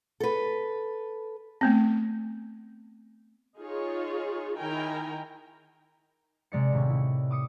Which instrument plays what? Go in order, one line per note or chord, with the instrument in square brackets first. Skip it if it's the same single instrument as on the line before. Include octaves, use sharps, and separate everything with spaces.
[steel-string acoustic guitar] A4 B4
[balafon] A3 B3 C4
[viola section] D#4 F4 G#4 C#5
D#3 E4 A#4 G5 G#5 A#5
[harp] C3 G#3 D5 C#7
D#1 A2 C3 C#5 C#6
E4
D6 D#6 C#7 D7